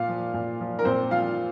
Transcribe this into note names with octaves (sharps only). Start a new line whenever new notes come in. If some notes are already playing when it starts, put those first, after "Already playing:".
Already playing: A#2 F4 F5
F3
A#2
F3
A#4
A#2 C4 C5
F3 F4 F5